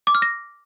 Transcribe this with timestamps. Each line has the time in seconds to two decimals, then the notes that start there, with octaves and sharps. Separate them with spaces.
0.07 D6
0.15 F6
0.22 A#6